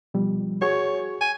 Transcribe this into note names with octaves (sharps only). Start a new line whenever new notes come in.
B2 F3 G3
F#4 G#4 C#5 C#6
G#5